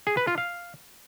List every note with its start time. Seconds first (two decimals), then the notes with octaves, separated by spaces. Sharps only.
0.07 G#4
0.17 B4
0.27 F4
0.38 F5